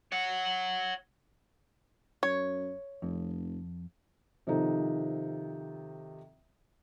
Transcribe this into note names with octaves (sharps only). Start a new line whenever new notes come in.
C#5 F#5
F#2 C#5
F1 F2
C3 D#3 F3 D#4 A4